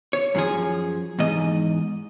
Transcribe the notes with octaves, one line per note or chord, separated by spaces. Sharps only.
C#5
F#2 F3 G#4
E2 G#2 D#5